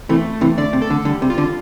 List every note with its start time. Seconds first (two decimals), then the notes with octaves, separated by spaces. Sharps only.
0.09 C3 E3 A3
0.33 A3
0.41 C3 E3
0.58 D3 D5
0.73 C3
0.82 A4
0.90 D3
1.05 D3 G3
1.22 C3
1.30 F4
1.38 D3